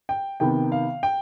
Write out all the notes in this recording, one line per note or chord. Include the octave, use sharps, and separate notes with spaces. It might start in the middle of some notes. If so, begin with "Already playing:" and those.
G5
C3 D#3 B3 G5
F5
G5